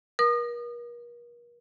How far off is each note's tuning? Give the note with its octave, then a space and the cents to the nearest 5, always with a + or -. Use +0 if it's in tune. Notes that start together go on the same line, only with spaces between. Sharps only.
A#4 +40 D#6 -35